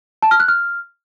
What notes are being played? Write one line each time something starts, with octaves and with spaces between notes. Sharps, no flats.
A5
F6
F#6
F6